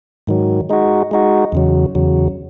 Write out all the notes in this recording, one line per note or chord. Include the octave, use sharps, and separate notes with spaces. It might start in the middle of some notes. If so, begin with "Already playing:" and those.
G#2 D#3 F#3
G#3 D#4 F#4
G#3 D#4 F#4
E2 C#3 F#3
E2 C#3 F#3